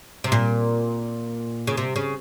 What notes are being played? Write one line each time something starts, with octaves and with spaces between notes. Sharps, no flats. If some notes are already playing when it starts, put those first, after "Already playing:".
C3
A#2
C#3
C3
C#3